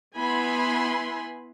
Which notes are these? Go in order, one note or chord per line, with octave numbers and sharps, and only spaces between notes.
B3 E4 G#5 B5 C6